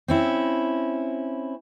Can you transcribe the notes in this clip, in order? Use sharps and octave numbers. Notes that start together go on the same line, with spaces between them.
C4 C#4 E4